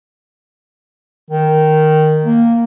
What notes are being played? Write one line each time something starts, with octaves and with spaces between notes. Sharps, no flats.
D#3
A#3